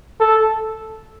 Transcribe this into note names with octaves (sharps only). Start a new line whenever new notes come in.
A4